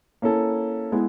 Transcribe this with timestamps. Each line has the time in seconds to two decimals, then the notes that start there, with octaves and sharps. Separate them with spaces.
0.22 A#3 C#4 E4 A4
0.92 G#3 B3 E4